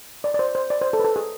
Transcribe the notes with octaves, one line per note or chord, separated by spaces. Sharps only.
D5
D5
C5
C5
D5
C5
A4
B4
A4
G#4